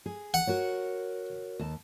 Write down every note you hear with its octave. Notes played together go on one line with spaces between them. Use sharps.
G#4
F#5
F#4 A#4 C#5
D#2 A5